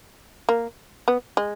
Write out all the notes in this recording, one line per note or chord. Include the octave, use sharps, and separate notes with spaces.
A#3
B3
G#3